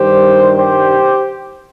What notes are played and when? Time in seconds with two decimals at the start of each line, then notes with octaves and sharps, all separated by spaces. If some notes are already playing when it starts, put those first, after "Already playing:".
Already playing: G2 D#3 G3 G4 C5
0.57 G4 C5